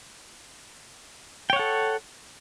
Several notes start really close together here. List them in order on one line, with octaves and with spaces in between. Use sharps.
G5 C#5 F#5 A4